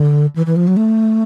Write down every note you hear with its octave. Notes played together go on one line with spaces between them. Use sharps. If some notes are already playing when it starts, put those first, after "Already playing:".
Already playing: D3
E3
E3
F3
F#3
A3